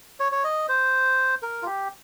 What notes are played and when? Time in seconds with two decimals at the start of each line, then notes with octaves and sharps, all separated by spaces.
0.20 C#5
0.32 C#5
0.44 D#5
0.69 C5
1.43 A#4
1.62 F4
1.66 G4